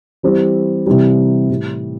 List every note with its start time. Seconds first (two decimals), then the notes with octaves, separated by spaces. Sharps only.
0.23 E3 G3 C4
0.87 C3 E3 G3
1.50 A2 E3 G3